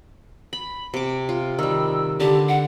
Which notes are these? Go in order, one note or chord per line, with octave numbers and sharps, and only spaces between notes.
B5
C3 D6
F4
D#3 G3 E6
D3 G4
F#5